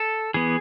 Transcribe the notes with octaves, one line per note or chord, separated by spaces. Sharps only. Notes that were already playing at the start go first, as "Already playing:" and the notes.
Already playing: A4
E3 B3 G#4